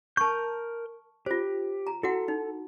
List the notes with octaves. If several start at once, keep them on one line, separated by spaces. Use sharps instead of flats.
A#4 A5 C#6 G6
F4 G4 C5
A#5
E4 F#4 A4 F#5
D#4